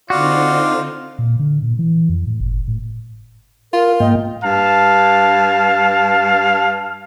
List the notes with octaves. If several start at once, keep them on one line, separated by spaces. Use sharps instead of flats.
D3 C4 D#4 F4 F#4 D5
A#2
D3
A#2
E3
F2
A2
G1
A2
F4 A#4
G#2 A#3 D#5 G5
G2 F5 A5